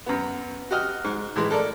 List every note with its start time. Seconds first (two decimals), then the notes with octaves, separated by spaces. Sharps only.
0.06 F#2 B3
0.71 F#4 G4 D#5 F6
1.04 G#2
1.35 A2 E3 G#3
1.51 A4 A#4 D5